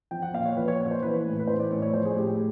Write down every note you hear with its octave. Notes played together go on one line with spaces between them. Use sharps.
F3 G5
F#5
A#2 F5
C#5
F3 B4
C#5
A#2
C#5
C5
E3 B4
A2
B4
E3 C5
D5
A2 C#5
C#5
F3 C5
G#4
A2 G4
G#4